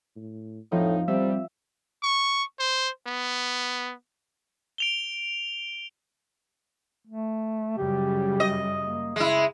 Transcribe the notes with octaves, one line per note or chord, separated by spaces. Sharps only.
A2
F2 A2 F3 D#4
C3 G3 C4 E5
C#6
C5
B3
D7 F7 G7
A3
F#2 C#3 G3 G4
D#5
A#3
C#3 G#3 E4